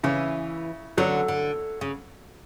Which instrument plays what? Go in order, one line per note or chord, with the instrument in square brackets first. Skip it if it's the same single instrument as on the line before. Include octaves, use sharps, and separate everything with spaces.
[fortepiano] C#3 [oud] E3
[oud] D3 [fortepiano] F#3
[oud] D3
C#3